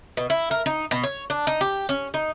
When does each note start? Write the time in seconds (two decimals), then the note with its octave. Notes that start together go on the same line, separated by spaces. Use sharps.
0.17 B2
0.30 E4
0.51 A#4
0.66 D#4
0.91 B2
1.03 C#5
1.30 D4
1.47 D#4
1.61 G4
1.89 C#4
2.14 D#4